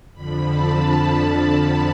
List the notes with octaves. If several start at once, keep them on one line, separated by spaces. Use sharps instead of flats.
F2 D3 F3 B5
A5